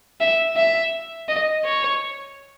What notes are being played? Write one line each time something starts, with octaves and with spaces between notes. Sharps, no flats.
E5
E5
D#5
C#5